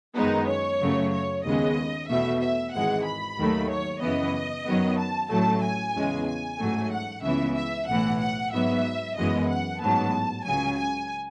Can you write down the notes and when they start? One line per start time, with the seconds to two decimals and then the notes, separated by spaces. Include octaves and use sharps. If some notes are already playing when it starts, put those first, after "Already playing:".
0.15 F#2 D#3 G#3 B3 D#4
0.48 C#5
0.81 F#2 C#3 F#3 A3
1.12 C#5
1.44 D#2 C#3 G#3 B3 D#5
2.08 E2 B2 A3 E5
2.41 E5
2.73 G#1 G#2 E3 G#3 F#5
3.05 B5
3.37 D#2 D#3 F#3 A3
3.69 C#5
4.01 F#2 C#3 E3 B3 D#5
4.66 F#2 D#3 F#3 B3
4.98 A5
5.30 A1 A2 F#3 A3 A5
5.63 G#5
5.95 E2 C#3 G#3
6.27 G#5
6.59 A1 G#2 F#3 A3
6.91 F#5
7.23 C#2 C#3 E3 B3 E5
7.56 E5
7.88 B1 A2 E3 F#5
8.20 F#5
8.52 G#2 F#3 B3 E5
9.16 F#2 E3 G#3 B3 D#5
9.49 F#5
9.80 A1 G#2 F#3 B3 A5
10.44 C#2 C#3 F#3 G#5
10.76 G#5